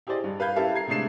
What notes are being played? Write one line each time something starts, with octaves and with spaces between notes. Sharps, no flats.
E4 G4 G#4 C5 D5 D#5
G2
B4 F5 B5 G6 G#6
C#4 E4 G4 A4 E5 F5
A#5 G#6 C7
C3 G#3 A3 D4 C7 E7